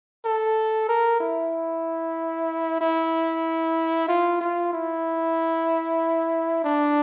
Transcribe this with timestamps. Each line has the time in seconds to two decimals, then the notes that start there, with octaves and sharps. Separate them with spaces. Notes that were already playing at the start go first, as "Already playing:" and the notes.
0.25 A4
0.89 A#4
1.21 E4
2.81 E4
4.08 F4
4.41 F4
4.73 E4
6.64 D4